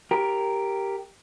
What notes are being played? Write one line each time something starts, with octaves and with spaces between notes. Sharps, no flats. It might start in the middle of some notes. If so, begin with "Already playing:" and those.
G4 A#4